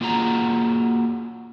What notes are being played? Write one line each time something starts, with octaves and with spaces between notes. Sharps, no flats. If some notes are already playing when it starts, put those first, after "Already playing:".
A#3 F4 F#4 G#4 A#5